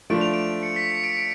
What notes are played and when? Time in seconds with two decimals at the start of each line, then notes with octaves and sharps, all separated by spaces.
0.10 F3 A3 D4 D7
0.21 F7
0.33 D7
0.63 C#7
0.76 B6
0.90 C#7
1.04 D7
1.17 D7